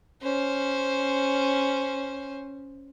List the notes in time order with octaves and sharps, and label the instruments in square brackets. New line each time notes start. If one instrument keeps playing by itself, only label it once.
[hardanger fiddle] C#4 C5